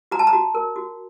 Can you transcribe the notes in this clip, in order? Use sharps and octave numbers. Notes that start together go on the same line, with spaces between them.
F#4 A#5
A5
A#5
F#4
A#4
F#4